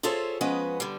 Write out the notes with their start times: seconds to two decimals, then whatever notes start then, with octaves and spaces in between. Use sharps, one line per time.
0.03 F4 G#4 A4 C5 C#5 E5
0.41 F3 G#3 B3 C#4 B4 D#5
0.80 D3 G3